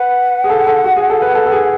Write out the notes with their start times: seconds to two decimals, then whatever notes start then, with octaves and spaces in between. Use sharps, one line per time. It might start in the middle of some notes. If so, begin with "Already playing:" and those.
Already playing: B4 F#5
0.44 G#4
0.50 A4
0.67 A4
0.84 F#4
0.97 G#4
1.10 A4
1.22 B4
1.35 A4
1.46 A4
1.52 G#4